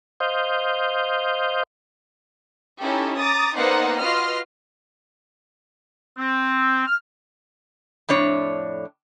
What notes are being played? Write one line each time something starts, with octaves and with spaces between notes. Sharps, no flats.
C5 D#5 F5 G6
C#4 D#4 E4 G4 A4
A#5 D6 D#6 A6
A#3 B3 D#4 C5 D5 F#5
F4 F#4 B4 D#5 C6 F6
C4
F6
F2 A2 D4 C#5